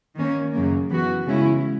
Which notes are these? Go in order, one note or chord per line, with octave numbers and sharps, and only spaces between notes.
D#3 A#3 C#4
F#2 C#3 F#3 A#3
E3 B3 F#4
C#3 G#3 C#4 E4